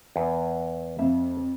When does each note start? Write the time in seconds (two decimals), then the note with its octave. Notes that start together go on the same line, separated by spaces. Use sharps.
0.16 E2
0.99 F2 E5 F5